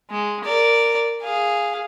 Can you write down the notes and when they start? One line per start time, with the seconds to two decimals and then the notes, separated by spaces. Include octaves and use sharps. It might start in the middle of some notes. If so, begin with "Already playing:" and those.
0.11 G#3
0.45 A#4 D5
1.22 G#4 F5